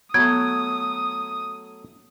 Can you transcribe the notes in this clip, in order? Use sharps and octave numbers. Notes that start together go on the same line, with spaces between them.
F#3 A3 B3 D#6 G#6